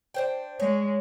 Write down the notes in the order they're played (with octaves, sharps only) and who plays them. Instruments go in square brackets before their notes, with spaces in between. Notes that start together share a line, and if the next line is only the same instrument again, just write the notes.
[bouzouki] D4 C5 G5
[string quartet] G#3 [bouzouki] C#5